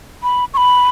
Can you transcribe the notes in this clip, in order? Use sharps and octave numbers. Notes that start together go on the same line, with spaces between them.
B5
C#6
B5